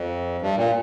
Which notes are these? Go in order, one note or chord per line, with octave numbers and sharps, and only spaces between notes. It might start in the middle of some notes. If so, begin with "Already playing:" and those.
Already playing: F2
G2
A#2